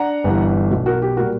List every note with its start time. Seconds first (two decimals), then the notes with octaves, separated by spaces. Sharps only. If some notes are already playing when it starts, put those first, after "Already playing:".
Already playing: D4 F#5 A#5
0.24 G1 G2 E3 G3
0.71 B1 B2 F#3
0.86 F#4 A#4
1.02 G4
1.17 A#2 G3 F#4 A#4